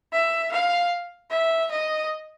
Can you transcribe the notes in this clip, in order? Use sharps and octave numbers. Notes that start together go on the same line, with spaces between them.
E5
F5
E5
D#5